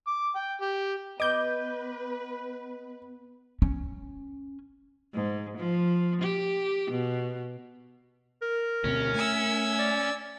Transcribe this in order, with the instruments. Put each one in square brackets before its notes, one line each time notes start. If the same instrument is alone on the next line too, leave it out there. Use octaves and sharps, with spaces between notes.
[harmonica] D6
G5
G4
[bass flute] B3 [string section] B4 [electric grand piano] D#5 [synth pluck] D6 G6
[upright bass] C#4
[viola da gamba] G#2
F3
G4
B2
[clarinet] A#4
[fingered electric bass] D2 B2 C4 [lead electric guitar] C#4
[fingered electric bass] A3 [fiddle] G#5 E6
[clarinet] D5